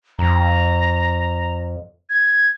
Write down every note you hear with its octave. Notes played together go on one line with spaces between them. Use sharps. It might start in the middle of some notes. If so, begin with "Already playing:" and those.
F2 A#5
G#6